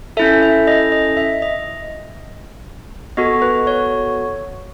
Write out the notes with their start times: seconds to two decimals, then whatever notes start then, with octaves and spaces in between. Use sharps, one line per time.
0.17 C#4 E4 A4 E5
0.43 E5
0.67 D#5
0.92 D#5
1.17 E5
1.42 D#5
3.17 B3 F#4 A4 D#5
3.42 B4
3.67 C#5